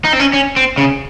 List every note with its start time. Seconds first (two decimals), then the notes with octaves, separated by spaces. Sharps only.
0.05 D#4
0.13 C4
0.20 C#4
0.33 C#4
0.56 C4
0.78 C#3